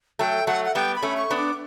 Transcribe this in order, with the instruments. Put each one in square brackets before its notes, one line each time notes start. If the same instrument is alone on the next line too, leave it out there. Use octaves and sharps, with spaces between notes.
[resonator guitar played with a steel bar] F#3 A3 [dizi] G5
[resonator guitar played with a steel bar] F#3 A3 [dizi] F#5
[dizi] F#5
[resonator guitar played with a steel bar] G3 B3 [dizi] G5
[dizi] B5
[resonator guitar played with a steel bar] A3 C#4
[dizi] C#6
[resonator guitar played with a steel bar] B3 D4
[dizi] D6